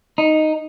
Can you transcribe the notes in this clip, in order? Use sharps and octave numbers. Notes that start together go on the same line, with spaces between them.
D#4